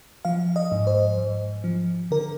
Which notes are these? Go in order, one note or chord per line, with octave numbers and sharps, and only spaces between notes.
F3 F5
D#5
G#2
C5
G#2
F3
D3 A#4